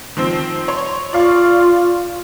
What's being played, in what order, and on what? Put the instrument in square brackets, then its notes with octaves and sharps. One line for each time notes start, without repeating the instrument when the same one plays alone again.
[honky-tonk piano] D#3 F3 C4
C#5 C6
[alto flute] F4 [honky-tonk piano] D5 F5 C#6